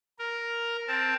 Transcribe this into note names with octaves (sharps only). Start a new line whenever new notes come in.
A#4
C4 A5